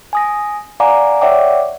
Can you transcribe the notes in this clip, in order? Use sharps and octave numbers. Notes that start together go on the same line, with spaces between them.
G#5 D#6 A#6
D5 F5 F#5 G#5 A#5 D6
C#5 D5 E5 F#5 G5 D6